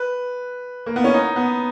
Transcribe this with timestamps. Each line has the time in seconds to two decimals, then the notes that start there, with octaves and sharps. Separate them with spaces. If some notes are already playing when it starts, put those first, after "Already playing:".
Already playing: B4
0.86 A#3
0.96 B3
1.04 C#4
1.14 D#4
1.36 B3